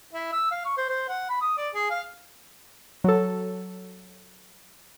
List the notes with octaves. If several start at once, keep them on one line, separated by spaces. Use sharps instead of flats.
E4
E6
F5
C#6
C5
C5
F#5
B5
D#6
D5
G#4
F5
F#3 A4